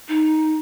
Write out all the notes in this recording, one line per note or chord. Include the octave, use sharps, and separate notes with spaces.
D#4